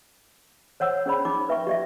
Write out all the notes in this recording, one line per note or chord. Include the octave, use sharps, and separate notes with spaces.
C5 C#5 F#5 E6
C#4 G#4 C5 D5 B5
D#4 D6
B4 E5 G5 C#6
G4 D5 E5